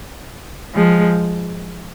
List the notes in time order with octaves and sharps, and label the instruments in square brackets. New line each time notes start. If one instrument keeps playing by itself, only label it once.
[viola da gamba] F3 G#3